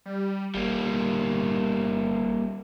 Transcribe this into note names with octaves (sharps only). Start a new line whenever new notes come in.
G3
G1 G3 A#3